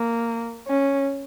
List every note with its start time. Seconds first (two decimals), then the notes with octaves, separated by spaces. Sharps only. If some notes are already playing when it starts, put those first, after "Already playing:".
Already playing: A#3
0.67 C#4